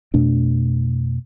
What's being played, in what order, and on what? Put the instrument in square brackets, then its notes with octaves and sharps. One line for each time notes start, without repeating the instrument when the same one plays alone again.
[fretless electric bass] F2 B2 A3 D4